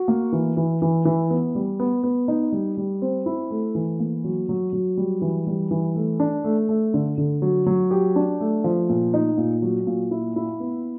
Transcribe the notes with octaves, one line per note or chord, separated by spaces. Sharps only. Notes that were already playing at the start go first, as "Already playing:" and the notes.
Already playing: F#4
A#3
E3
E3
E3
E3
B3
G3
B3
B3
D#4
G3
G3
C4
E4
A3
E3
A#3
F#3
F#3
F#3
G3
E3
G3
E3
A3
D4
A3
A3
D3
D3
F#3
F#3
G4
D4
A3
F3
A#2
D#4
A#2
F#3
A#2
E4
E4
B3